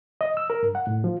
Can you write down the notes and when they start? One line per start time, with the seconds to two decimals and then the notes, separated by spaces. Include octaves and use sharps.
0.21 D#5
0.37 E6
0.50 A#4
0.63 G2
0.75 F#5
0.87 A2
1.04 F3